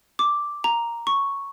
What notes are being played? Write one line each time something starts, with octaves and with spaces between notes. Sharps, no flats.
D6
A#5
C#6